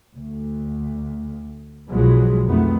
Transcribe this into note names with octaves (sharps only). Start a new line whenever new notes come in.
D2
B1 F3 F#3 G#3 B3
F2 D#3 A3 B3